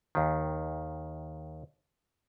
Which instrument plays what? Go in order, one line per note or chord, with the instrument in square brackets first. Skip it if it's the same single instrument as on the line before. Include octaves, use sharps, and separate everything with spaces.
[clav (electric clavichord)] D#2 D#3